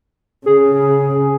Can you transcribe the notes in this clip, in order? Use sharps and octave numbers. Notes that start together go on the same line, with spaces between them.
C#3 G#4